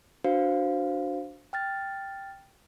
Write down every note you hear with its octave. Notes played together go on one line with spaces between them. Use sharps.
D4 F#4 B4 C5 F5
G5 F6 A6